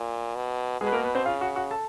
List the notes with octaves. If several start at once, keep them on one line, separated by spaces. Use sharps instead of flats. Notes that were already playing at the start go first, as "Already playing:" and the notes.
Already playing: A#2
B2
B2 G#3 G#4
B4
A#3 A#4
B3 B4
C4 C5
C#3 F4 F5
F#4 F#5
F#4 F#5
A4 A5